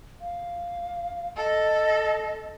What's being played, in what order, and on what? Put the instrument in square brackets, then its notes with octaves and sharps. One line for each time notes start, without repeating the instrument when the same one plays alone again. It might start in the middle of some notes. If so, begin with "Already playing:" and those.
[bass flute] F5
[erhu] A4 [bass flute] D#5